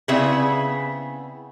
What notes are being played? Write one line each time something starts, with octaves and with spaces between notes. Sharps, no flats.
C#3 B3 C4 E4 G#4 E5